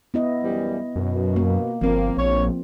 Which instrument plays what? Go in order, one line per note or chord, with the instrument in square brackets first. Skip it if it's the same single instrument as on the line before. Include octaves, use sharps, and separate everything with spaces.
[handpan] B3 E4 D#5
[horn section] F#2 E3 G3
[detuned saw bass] F#2 [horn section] B2
[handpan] A#3
[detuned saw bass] G1 [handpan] F3 C4 [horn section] A#3
[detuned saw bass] A#1 [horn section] C#5